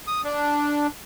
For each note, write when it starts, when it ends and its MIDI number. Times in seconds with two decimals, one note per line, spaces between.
0.08 0.21 87
0.25 0.87 62